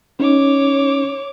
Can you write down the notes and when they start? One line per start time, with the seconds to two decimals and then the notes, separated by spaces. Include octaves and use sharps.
0.20 C#4 D#4 C#5 D6